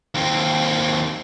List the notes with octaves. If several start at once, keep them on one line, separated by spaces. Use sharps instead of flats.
D#2 C4